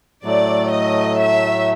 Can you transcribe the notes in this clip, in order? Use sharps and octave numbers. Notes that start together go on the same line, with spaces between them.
A2 F#3 A3 D5
D#5
E5